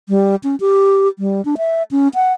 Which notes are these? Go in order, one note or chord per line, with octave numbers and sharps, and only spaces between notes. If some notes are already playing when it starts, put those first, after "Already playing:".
G3
C#4
G4
G3
D4
E5
C#4
F#5